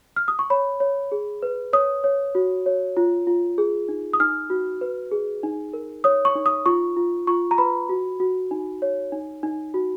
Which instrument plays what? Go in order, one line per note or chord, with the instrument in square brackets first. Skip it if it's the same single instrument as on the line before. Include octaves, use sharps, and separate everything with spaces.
[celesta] F6
D#6
C#6
C#5 B5
C#5
G#4
B4
C#5 D#6
C#5
F#4
C#5
F4
F4
G#4
D#4
D#6
D#4 F6
F#4
B4
G#4
D#4
A#4
C#5 D#6
C#6
D#4
D#6
F4 C#6
F4
F4 C#6
A#5
B4 B5
F#4
F#4
D#4
C#5
D#4
D#4
F#4